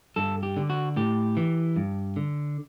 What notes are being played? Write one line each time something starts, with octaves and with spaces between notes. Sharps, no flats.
G2 A4
G4
D3
F#4
A2 G4
E3
G2
D3